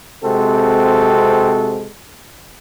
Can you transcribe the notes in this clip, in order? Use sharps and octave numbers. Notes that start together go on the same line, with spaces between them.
C3 G#3 C4 F#4 A4